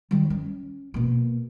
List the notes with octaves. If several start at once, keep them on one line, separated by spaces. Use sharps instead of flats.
D#3 G3
C#4
B2 A#3